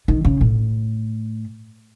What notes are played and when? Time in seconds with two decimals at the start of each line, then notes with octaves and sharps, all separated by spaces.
0.08 D#3
0.25 C#3
0.41 A2